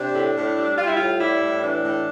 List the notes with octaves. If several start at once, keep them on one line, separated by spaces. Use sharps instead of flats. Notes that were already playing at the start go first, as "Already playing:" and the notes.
Already playing: C3 D4
A2
A2
G3
G3 F4
E4
A2 F4
G3 E4
A2
E3 D4
A2